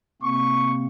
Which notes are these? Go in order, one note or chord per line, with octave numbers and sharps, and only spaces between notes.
C3 A#3 C4 C#6